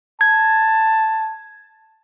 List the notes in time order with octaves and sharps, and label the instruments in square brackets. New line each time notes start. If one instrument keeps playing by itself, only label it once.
[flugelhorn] A5 [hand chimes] G#6